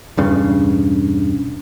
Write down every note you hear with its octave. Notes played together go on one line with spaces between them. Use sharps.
E1 G2 C#3